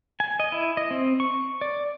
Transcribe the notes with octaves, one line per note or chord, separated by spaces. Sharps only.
G#5
D#5
E4
D#5
C4
C#6
D5